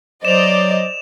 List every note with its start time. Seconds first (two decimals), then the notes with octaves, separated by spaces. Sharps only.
0.25 F#3 C5 D5 D#5 E7 F7